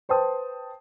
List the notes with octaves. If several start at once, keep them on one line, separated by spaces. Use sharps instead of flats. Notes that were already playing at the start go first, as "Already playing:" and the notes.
B4 C5 G5 A5 D#6